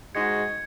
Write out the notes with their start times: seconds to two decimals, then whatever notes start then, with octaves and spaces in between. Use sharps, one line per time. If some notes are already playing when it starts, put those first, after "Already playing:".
0.14 G#2 G#3 D#4 F#4 G#6 C#7